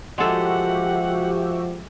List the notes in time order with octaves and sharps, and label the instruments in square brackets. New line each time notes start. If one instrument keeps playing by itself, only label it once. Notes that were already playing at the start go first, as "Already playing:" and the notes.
[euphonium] F3 [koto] G#3 A4 [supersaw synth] F#4 G4 E5 [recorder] F#5